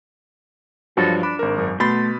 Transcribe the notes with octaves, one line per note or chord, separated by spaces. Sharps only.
G2 F3 F#3 F#4 A4
D4 B5
G#1 A#4
F#2
B2 A3 B5 C6 A6